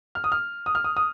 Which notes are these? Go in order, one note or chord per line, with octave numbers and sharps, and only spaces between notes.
F6
D#6
F6
D#6
F6
D#6
D#6